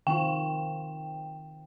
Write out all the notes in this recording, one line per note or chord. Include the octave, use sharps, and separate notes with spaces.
D#3 C4 F4 G5